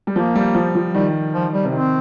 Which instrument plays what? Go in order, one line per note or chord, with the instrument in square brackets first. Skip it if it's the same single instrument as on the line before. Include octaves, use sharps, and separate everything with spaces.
[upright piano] G3
[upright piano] F3 [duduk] A#3
[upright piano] G3
F3
F3
[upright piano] D#3 [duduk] G3
[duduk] F3
G3
[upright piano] C3
[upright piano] D#3 [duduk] C4